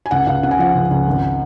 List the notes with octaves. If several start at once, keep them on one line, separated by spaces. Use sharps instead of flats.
G#5
C#2 F#5
C#2 F5
C#3 F#5
G#5
F3 F#5
C#2
C#2
G#1